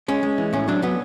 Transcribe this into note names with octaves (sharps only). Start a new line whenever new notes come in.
G#3 C#4
G#3
E3
A2 C#4
F#3 D4
F#3 B3